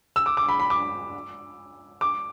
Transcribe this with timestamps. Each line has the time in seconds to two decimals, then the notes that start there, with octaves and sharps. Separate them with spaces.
0.16 E6
0.26 D6
0.37 D6
0.49 B5
0.60 B5
0.70 D6
2.01 D6